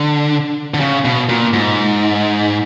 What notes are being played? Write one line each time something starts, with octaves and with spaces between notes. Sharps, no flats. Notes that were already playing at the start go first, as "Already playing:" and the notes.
Already playing: D3
D3
C#3
B2
A#2
G#2